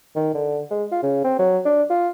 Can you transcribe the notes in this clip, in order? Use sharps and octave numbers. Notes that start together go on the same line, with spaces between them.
D#3
D3
G#3
F4
C#3
C4
F#3
D4
F4